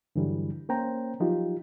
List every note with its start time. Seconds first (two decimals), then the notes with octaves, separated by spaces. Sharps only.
0.16 G2 D3 E3 F#3 G3
0.69 A#3 C#4 C5 G5 A#5
1.20 F3 F#3 D#4 F4 G4